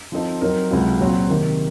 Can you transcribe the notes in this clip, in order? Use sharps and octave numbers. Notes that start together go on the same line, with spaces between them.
F3 C4 D#4 A4
F#3 C4 D#4 A#4
C#2 C3 F#3
A#2 F#3 C4 F#4
C3 D#3 A#3